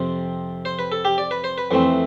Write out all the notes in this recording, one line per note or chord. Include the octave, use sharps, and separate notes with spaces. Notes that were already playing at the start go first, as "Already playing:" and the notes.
Already playing: F2 C3 F3 C4
C5
B4
A4
G4
D5
B4
C5
B4
F2 E3 A3 C4